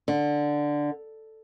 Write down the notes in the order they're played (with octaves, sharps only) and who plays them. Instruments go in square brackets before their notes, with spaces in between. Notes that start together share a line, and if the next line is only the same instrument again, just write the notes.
[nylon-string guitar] D3